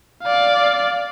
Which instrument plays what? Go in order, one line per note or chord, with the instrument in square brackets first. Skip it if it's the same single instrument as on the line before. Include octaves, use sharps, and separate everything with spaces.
[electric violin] D5 F5